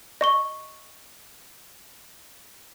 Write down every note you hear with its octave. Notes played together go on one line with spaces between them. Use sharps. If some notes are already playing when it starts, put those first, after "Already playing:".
D#5 C#6 G7